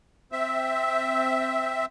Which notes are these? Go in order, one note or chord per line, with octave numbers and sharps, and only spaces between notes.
C4 E5